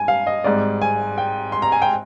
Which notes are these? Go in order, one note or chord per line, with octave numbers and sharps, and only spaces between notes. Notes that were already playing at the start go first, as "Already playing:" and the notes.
Already playing: G2 G#5
F5
D#5
G#1 G#2 G3 D5
G#5
G5
C6
A#5
G#5
G5